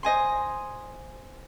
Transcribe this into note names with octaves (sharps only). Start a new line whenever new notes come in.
C5 D#5 G#5 C6